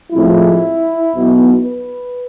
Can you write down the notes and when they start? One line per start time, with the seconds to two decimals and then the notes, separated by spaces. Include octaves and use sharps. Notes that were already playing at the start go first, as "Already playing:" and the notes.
0.13 A2 F3 G#3 C4 E4
1.14 B1 B2 B3
1.65 B4